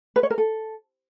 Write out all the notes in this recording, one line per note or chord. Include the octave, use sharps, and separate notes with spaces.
B4
C#5
A#4
A4